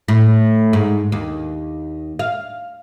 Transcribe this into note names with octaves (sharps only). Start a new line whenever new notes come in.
A2
G#2
D#2
F5